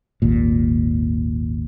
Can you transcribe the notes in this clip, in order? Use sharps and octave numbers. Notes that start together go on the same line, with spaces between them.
G#1 D#2 A#2